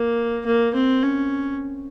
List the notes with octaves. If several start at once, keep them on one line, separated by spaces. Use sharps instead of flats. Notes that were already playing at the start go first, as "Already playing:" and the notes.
Already playing: A#3
A#3
C4
C#4